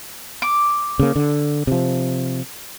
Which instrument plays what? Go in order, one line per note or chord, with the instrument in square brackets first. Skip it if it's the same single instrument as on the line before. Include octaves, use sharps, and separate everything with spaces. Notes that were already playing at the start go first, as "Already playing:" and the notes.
[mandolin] D6
[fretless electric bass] C#3 A#3
D3
C3 F3